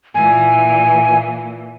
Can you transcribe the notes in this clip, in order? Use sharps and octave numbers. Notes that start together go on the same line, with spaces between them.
A#2 E3 G#5